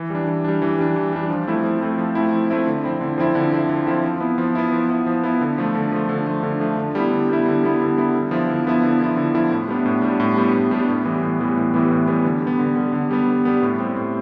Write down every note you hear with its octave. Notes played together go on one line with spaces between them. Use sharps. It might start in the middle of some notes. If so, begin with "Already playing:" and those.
Already playing: E3
G3 D4
E3
G3 D4
E3
G3 D4
E3
G3 D4
F3
A3 C4 E4
F3
A3 C4 E4
F3
A3 C4 E4
F3
A3 C4 E4
D3
F3 C4 E4
D3
F3 C4 E4
D3
F3 C4 E4
D3
F3 C4 E4
F3
B3 E4
F3
B3 E4
F3
B3 E4
F3
B3 E4
D3
F3 A3
D3
F3 A3
D3
F3 A3
D3
F3 A3
D3
G3 B3 E4
D3
G3 B3 E4
D3
G3 B3 E4
D3
G3 B3 E4
D3
F3 B3 E4
D3
F3 B3 E4
D3
F3 B3 E4
D3
F3 B3 E4
A2
G3 B3 D4
A2
G3 B3 D4
A2
G3 B3 D4
A2
G3 B3 D4
A2
E3 G3 B3
A2
E3 G3 B3
A2
E3 G3 B3
A2
E3 G3 B3
D3
G3 B3
D3
G3 B3
D3
G3 B3
D3
G3 B3
A2
G3 C4
A2